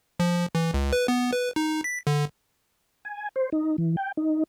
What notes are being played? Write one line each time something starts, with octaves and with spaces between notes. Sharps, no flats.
F3
E3
C#2
B4
B3
B4
D#4
B6
D3
G#5
C5
D#4
E3
G5
D#4